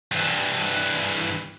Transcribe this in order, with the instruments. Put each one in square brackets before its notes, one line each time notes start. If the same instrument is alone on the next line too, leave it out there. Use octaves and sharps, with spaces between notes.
[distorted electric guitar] G2 E3